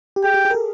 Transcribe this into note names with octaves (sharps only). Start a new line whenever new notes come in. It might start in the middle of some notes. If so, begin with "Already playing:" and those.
G4
G#4 G5
G4
G#4
A#4
A4